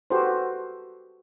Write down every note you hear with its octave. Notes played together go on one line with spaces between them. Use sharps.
F#4 G4 A4 B4 C5